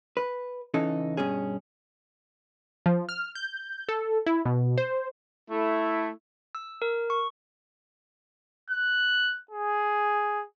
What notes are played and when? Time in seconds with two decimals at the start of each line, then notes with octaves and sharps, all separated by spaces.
0.17 B4
0.74 C#3 E3 D#4 A4
1.17 G2 B2 C#4 G#4
2.86 F3
3.09 F6
3.35 G6
3.89 A4
4.26 E4
4.45 B2
4.78 C5
5.50 A3 E4
6.55 E6
6.82 A#4
7.10 C#6
8.70 F#6
9.51 G#4